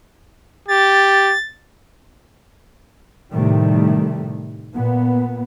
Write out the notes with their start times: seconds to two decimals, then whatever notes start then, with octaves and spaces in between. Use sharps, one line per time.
0.68 G4 A6
3.33 A2 C3 D#3 G3 A3
4.75 A#2 B3